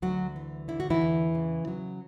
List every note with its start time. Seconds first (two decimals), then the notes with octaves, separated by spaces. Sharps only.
0.02 D2 F#3 F#4
0.36 E3
0.68 D3 E4
0.80 F#4
0.90 E3 E4
1.01 E2
1.35 C#3
1.67 F#3